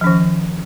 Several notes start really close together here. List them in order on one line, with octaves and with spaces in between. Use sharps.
F3 C#4 D#3